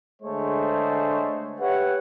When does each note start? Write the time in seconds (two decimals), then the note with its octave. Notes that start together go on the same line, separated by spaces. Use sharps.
0.22 D3 G#3 A3 G#4 C5 C#5
1.60 G4 B4 C#5 E5 F#5